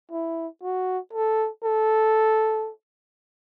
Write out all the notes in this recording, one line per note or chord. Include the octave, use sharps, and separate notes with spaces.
E4
F#4
A4
A4